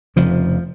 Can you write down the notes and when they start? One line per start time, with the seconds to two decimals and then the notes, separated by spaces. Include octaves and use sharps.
0.16 F1 F2 C#3 F3